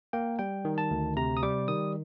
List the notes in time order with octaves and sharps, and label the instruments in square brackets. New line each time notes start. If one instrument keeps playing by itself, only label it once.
[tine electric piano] A#3 G5
G3 G5
D#3
A5
D2
C3 A#5
D#6
G3 D6
D#3 D#6